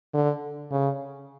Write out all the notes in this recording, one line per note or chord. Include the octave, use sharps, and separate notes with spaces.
D3
C#3